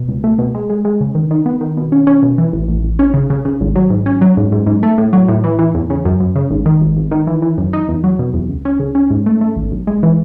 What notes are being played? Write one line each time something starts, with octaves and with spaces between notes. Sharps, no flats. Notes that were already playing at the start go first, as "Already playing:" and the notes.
Already playing: B2
C#2
A3
B2
G#3
G#3
G#3
C#3
D#3
D#3
B3
D#3
B2
C#4
C#4
B2
E3
A1
A1
A1
C#4
C#3
C#3
C#3
G#1
F#3
G#2
C#4
F#3
G#2
G#2
G#2
A3
A2
F#3
A2
E3
E3
E2
C#3
F#2
F#2
C#3
G#1
D#3
G#1
G#1
D#3
E3
E3
F#2
D#4
E2
F#3
B2
E2
C#2
C#4
C#3
C#4
G#2
A3
A3
G#1
B1
G#3
E3